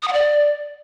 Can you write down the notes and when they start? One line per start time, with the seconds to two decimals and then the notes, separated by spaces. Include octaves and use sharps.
0.03 D#6
0.08 F#5
0.13 D5